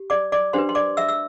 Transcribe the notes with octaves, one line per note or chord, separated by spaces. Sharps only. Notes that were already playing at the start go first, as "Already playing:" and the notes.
Already playing: G4
D5 D6
D5 D6
D4 G4 B4 C5 C6
C6
D5 D6
E5 E6
E6